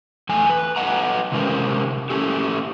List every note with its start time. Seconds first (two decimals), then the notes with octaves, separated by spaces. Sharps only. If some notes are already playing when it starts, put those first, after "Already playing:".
0.29 E2 A3 G#5
0.50 B4
0.76 A4 B4 C#5 D#5 F#5 A#5
1.32 C3 F#3 G#3 C#4 A#4 C5
2.10 A3 C#4 G4 A4